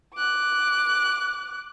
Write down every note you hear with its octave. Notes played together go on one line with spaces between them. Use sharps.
D6 F#6